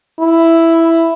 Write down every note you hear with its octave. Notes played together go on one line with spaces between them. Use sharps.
E4